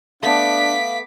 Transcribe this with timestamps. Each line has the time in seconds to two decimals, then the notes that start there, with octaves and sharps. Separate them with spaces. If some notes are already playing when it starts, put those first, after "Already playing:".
0.23 A3 B3 D4 F5 D6 B6